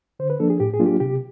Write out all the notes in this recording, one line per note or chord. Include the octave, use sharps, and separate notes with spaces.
D3 C5
B4
F3 A#3 D4 A4
G#4
A2 G4
G#4
F#3 A#3 D4 F4
G4
C3 G4